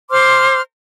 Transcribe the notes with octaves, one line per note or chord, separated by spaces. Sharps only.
C5 C6 D6 F6